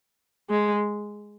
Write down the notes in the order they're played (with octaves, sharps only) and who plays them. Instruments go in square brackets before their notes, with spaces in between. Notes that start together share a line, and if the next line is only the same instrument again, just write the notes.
[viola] G#3